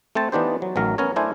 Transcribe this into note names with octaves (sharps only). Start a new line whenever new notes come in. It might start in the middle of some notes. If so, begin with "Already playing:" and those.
A3 C4 C5 A5
E3 B3 D4 D#4 G4 C5
F#3
A1 D#3 F#3 A#4
B3 C#4 A#4 C#5
A3 D4 E4 C5 G#5